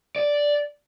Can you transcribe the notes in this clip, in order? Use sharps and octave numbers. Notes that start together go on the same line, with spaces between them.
D5